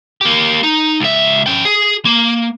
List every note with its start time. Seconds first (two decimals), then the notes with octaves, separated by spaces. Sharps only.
0.21 A#3 G4
0.63 D#4
1.00 C#2 E5
1.46 C#4 G5
1.65 G#4
2.05 A#3